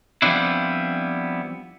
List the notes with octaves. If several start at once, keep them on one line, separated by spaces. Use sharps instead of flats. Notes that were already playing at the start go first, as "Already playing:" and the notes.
F3 G3 B3 C4 D4 E4